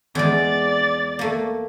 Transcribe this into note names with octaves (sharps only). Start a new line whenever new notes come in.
E2 G#3 D5 A6
A3 A#3